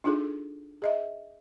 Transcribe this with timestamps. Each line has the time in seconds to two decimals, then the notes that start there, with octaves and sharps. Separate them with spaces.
0.04 D4 D#4 F4 G#4 A4
0.82 G#4 D#5 E5